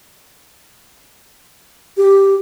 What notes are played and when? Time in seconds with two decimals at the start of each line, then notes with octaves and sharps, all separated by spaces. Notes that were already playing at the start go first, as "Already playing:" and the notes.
1.97 G4